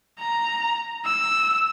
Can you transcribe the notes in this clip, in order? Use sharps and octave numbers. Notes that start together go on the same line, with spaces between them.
A#5
E6